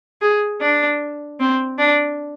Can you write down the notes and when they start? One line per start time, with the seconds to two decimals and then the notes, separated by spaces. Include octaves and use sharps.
0.21 G#4
0.61 D4
1.40 C4
1.79 D4